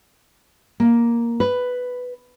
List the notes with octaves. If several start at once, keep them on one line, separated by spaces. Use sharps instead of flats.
A#3
B4